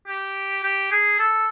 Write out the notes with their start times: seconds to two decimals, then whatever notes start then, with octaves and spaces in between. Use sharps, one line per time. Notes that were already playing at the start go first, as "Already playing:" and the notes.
0.07 G4
0.64 G4
0.91 G#4
1.19 A4